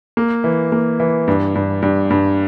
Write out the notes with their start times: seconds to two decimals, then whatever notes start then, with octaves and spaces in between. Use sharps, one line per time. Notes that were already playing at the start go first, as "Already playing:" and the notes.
0.17 A#3
0.44 E3
0.72 A#3
1.00 E3
1.28 G2
1.55 G2
1.82 G2
2.10 G2